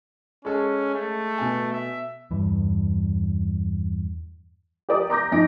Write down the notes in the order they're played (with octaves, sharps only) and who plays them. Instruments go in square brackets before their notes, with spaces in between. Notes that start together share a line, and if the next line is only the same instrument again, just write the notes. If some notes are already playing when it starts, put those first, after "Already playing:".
[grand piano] G#3 A4 [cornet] C#4
[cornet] A3
[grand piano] B2 G#5
[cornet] E5
[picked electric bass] E2 G2
[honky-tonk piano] G4 A#4 D5 D#6
A#5 D6 G6 A#6
F2 D#4 A#6 D7